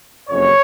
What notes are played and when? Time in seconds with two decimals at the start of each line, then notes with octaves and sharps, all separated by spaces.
0.30 F#1 F2 C#3 C#5